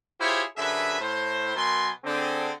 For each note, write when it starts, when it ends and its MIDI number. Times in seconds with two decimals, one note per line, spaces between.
0.20 0.43 64
0.20 0.43 65
0.20 0.43 67
0.20 0.43 68
0.20 0.43 72
0.20 0.43 73
0.57 1.00 42
0.57 1.00 50
0.57 1.00 68
0.57 1.00 71
0.57 1.00 76
1.01 1.55 45
1.01 1.55 72
1.56 1.88 47
1.56 1.88 54
1.56 1.88 70
1.56 1.88 80
1.56 1.88 84
2.05 2.50 50
2.05 2.50 60
2.05 2.50 68